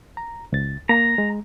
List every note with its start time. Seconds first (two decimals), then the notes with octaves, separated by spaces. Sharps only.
0.17 A#5
0.52 C#2 A6
0.89 A#3 A#5
1.18 G#3